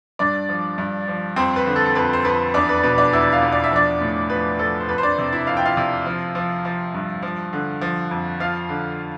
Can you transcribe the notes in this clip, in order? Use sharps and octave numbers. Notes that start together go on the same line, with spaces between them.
G2 D4 D5
F3
G2
F3
F2 C4 C5
B4
D3
A4
A4
F2 B4
C5
F2 B4
E2 D4 D5
B4
B2 B4
D4 D5
E2 E4 E5
F4 F5
E2
D5
E5
F3 D4 D5
A2
F3 B4
F3 A4
C5
F2 B4
C5
D4 D5
C3
E4 E5
F2 F5
G5
F4 F5
C3
F3
F3
F3
G2
F3
D3
F3
F2
F3 F4 F5
D3